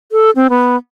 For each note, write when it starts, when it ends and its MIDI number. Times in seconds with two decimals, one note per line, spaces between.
0.12 0.31 69
0.36 0.47 60
0.50 0.76 59